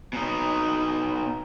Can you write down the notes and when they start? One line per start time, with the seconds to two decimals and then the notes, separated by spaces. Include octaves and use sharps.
0.13 B2 D#4